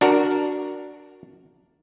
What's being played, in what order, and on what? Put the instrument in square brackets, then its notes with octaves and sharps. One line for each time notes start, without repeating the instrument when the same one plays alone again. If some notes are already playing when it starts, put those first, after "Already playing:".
[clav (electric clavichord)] D4 F#4 A#4